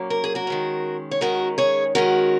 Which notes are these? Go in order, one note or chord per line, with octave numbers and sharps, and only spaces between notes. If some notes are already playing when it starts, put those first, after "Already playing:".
Already playing: A#2 F#3 A#3 C#4
A#4
G#4
F#4 A#4
D#3 G#3 C#4
C#5
D#3 G#3 C#4 F#4 A#4
G#4 C#5
D#3 G#3 C#4 F#4 A#4